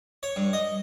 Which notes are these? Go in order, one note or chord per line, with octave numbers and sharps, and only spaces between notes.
C#5
G2
D#5